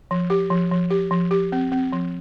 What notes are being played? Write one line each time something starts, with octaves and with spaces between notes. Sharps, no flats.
F3
G4
F3
F3
G4
F3
G4
C4
C4
F3